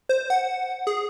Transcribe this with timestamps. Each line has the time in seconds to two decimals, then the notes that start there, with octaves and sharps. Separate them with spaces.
0.09 C5
0.30 F#5
0.87 G#4